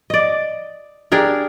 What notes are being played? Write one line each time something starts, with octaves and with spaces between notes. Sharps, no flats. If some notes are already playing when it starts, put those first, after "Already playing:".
D5 D#5
D4 G4 G#4 A#4